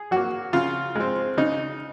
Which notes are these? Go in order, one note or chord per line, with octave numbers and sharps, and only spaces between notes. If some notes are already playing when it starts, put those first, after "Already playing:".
Already playing: G#4
F#3 A#3 F#4
C#3 F4
G#3 C4
C#3 D#4